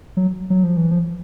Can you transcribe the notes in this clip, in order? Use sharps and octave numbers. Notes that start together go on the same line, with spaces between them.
F#3
F#3
F3
E3
F3